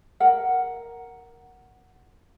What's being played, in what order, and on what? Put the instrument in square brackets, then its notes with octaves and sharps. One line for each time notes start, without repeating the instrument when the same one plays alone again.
[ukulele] A#4 F#5